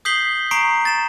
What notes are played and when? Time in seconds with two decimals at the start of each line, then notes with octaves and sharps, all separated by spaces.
0.05 D#6 G6 B6 C7 F#7 G7
0.51 A#5 C#6 C7 D7
0.85 A6 E7